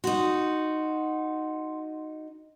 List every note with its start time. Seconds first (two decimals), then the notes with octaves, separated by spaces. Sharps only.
0.04 D#4 F#4 F#5 C6